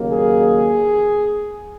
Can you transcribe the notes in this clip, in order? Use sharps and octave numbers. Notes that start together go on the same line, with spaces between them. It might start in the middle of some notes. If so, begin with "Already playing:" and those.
Already playing: D#2 C#3 F#3 A#3
G#4